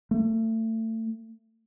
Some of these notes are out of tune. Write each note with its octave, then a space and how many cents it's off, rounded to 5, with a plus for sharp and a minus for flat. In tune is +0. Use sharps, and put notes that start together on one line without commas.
A3 +30